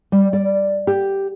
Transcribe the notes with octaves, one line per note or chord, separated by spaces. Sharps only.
G3
D5
G4